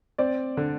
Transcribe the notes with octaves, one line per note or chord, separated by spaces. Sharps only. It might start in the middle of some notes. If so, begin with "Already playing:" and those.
C4 D5
D3